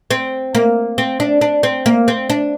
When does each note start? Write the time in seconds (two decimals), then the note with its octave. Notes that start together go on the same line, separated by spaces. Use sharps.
0.11 C4
0.55 A#3
0.98 C4
1.20 D4
1.41 D4
1.63 C4
1.86 A#3
2.08 C4
2.30 D4